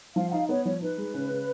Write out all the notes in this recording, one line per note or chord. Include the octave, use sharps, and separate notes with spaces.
F3 F5
F#5
D#4 F5
B3 C#5
F3 C#5
D#4 B4
G#3
C#3
C#3